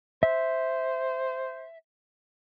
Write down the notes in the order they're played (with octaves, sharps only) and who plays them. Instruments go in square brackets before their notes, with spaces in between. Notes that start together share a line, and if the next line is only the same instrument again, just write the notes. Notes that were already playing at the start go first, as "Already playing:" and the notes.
[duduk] C5 [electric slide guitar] E5